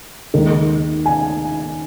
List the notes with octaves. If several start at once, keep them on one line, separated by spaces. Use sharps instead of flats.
D#2 D#3 G#3
G#5